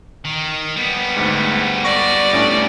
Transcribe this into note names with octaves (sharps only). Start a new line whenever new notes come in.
D#3
G3 B3
D2 G#2
D5 C#6 A#6
A2 C#4 D4